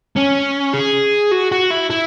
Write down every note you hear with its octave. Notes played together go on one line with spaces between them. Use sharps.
C#4
G#4
F#4
F#4
E4
E4